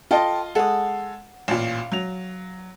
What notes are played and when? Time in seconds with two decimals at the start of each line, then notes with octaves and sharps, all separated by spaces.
0.11 F4 A4 D#5 G5 C6
0.55 G#3 A4 F#5 D#6
1.48 A1 A#2 F5
1.92 F#3 F7